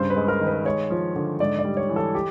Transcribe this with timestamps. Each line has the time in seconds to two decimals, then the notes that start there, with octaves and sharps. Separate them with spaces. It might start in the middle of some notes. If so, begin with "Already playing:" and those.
Already playing: G2 C#3 C5
0.10 B4
0.16 G#3
0.28 A#4
0.41 D#3
0.47 B4
0.65 G#3 C#5
0.91 F3
1.16 D3
1.40 G#2 D5
1.59 D5
1.65 G3
1.77 C#5
1.89 E3
1.96 A4
2.15 G4